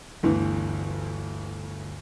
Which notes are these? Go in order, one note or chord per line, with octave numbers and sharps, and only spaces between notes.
G1 D2 E3